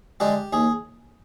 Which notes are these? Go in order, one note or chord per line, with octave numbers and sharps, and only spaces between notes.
D3 G#3 D4 G4
D#2 G#4